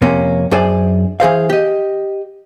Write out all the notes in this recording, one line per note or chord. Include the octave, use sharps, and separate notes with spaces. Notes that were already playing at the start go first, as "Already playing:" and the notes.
F2 C3 A#3 C#4
F#2 D4 G#4 C5 D5 G#5
E3 G#4 C5 F5
G4 D#5